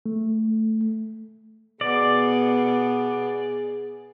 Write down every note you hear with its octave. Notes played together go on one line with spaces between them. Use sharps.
A3
B2 B3 G#4 D5